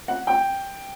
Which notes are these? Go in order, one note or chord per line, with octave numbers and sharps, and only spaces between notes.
F#5
G5